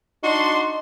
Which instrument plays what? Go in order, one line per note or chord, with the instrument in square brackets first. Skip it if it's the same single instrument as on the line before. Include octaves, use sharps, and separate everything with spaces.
[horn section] D4 F#4 C6 [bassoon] D#4